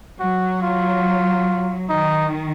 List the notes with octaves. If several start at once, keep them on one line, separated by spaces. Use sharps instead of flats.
F#3 F#4
F4
D#3 D#4